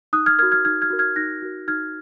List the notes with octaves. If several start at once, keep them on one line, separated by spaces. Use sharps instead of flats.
D#4 D#6 F#6
F6 G#6
F#4 A#4 F6 G#6
F6 G#6
D#4 F6 G#6
F6 G#6
F#4 A#4
F6 G#6
D#4 F#6 A#6
F#4 A#4
D#4 F6 G#6